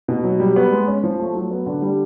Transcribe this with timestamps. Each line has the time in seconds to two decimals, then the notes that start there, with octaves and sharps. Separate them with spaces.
0.08 B2
0.24 F#3
0.40 G3
0.56 B3
0.72 G#3
0.87 C#4
1.04 F3
1.19 A3
1.35 F#3
1.51 B3
1.66 D3
1.82 G3